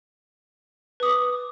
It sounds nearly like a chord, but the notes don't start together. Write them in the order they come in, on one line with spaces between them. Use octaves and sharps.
B4 D#6 D6